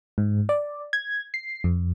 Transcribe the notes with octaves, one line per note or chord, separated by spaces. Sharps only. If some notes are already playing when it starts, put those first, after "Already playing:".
G#2
D5
G#6
C7
F2